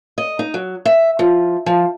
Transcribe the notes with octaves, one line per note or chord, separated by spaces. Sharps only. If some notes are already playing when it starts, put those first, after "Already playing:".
D#5
D#4
F#3
E5
F3
F3